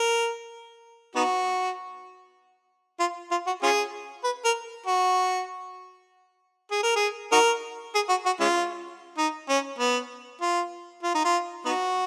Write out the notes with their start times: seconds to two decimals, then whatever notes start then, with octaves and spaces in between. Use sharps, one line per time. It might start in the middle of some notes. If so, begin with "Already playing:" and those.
Already playing: A#4
1.15 B3 D#4 F#4
3.00 F4
3.31 F4
3.47 F#4
3.63 C#4 F4 G#4
4.24 B4
4.45 A#4
4.86 F#4
6.71 G#4
6.83 A#4
6.96 G#4
7.32 D#4 F#4 A#4
7.95 G#4
8.10 F#4
8.26 F#4
8.40 G#3 C#4 F4
9.17 D#4
9.49 C#4
9.79 B3
10.41 F4
11.03 F4
11.15 D#4
11.25 F4
11.65 B3 D#4 F#4